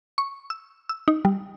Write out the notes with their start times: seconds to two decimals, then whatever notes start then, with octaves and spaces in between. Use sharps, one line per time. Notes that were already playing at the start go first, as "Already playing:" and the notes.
0.18 C#6
0.50 E6
0.89 E6
1.08 D#4
1.25 G3